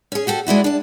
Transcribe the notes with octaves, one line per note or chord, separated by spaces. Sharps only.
C#4 G#4
F#4 G4 A4
G#3 D4 E4 F#4
D4 A5